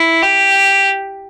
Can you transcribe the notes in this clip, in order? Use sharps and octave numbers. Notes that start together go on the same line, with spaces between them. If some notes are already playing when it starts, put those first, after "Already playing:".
Already playing: E4
G4